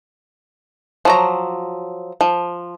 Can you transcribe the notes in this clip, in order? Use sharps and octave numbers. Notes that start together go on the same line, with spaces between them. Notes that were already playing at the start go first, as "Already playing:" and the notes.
F3 F#3 A#5
F3